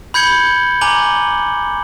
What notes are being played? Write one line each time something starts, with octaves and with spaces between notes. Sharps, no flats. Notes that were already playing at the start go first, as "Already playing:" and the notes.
B5 G6 G#6 C#7 F#7 G7
G#5 A#5 D6 F#6 F#7 G7